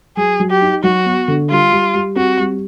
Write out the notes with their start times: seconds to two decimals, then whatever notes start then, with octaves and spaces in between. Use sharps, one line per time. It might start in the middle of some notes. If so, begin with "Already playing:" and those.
0.17 F#3 G#4
0.40 F#3
0.50 G4
0.62 D#4
0.83 F#3 F#4
1.06 B3
1.28 D3
1.50 G3 F4
1.72 G3
1.95 G3
2.16 C4 F#4
2.39 G3